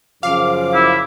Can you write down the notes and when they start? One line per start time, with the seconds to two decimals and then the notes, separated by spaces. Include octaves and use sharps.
0.23 F#2 C#3 F3 F5 D6
0.74 E4